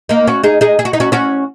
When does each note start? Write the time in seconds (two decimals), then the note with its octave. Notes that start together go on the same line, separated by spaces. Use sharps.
0.09 A#3 D#4
0.27 C#4 F#4
0.43 D#4 G#4
0.61 D#4 G#4
0.79 G#4
0.85 F#4
0.93 D#4
1.00 C#4 F#4
1.12 C#4 F#4